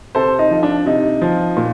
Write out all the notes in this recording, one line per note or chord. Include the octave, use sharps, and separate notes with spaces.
C3 A4 C5
D#4
F3
D4
C3 D#4
F3
A#2